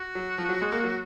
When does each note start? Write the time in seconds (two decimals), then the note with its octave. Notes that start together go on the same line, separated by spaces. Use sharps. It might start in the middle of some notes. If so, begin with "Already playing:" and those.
Already playing: F#4
0.15 F#3
0.38 F3
0.49 F#3
0.61 G#3
0.72 A#3
0.84 F#3